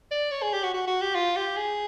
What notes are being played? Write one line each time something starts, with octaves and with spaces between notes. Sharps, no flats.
D5
C#5
G#4
G4
F#4
F#4
F#4
G4
F4
G4
G#4